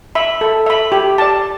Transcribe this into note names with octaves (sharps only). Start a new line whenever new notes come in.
E5 B5
A4
E5 B5
G4
D5 A5